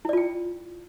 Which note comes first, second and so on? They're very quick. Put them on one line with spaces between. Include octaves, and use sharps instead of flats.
E4 D5 F4 G5